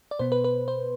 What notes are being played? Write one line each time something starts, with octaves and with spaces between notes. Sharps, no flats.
D5
B2 B3 C5
B4
B4
C5